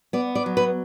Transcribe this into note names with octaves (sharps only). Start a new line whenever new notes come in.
B3 D5
D5
F#3
B4